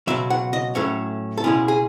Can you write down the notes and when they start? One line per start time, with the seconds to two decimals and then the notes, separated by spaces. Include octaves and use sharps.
0.07 C#2 B2 F#3 E5
0.30 F#5
0.53 D#5
0.75 A2 F#3 A3 C#4 C#5
1.38 A4
1.44 C#2 B2 G#3 C#4 E4 G#4
1.68 G#4